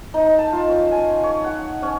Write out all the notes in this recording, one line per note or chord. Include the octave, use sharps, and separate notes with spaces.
D#4
A5
F4
C#4
G#5
C#5
F#5
C#4